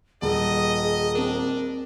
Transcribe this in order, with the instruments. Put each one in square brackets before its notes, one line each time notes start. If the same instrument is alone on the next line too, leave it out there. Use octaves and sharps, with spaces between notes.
[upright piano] D#1 [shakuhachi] G#4 [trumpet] D#5
[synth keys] C4 A#4 [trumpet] D4